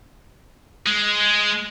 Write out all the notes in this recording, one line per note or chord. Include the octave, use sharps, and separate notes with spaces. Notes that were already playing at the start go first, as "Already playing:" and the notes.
G#3